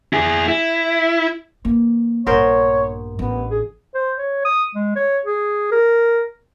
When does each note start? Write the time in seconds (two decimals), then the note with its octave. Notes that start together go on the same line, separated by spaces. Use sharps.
0.13 E4 G#4
0.48 E4
1.65 E3 A#3
2.26 A#1 G2 B3 A#4 C5 C#5
3.19 A1 B3 D4
3.51 G#4
3.95 C5
4.18 C#5
4.45 D#6
4.75 G#3
4.96 C#5
5.25 G#4
5.71 A#4